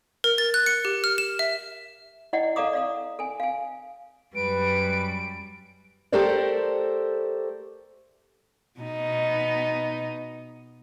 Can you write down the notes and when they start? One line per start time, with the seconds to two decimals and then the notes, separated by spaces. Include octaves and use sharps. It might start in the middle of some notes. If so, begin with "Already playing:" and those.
0.24 A#4
0.38 A6
0.54 F#6
0.66 C#7
0.85 G4
1.04 F6
1.18 E7
1.39 E5
2.33 E4 D5 D#5 F#5 G5
2.56 A4 D5 F5 A#5 D6 D#6
2.73 D5 F5 D#6
3.19 A4 G#5
3.40 F5 G#5
4.35 F#2 G3 B4 D7
6.12 A3 G4 A4 A#4 C5 D5
8.80 B2 B3 D#4